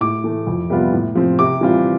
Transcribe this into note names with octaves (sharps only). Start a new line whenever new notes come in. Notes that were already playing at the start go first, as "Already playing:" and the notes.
A2 D6
E3 A3
F2
C3 G3 B3 F4
A2
F3 C4
C3 D6
E3 G3 C4 F4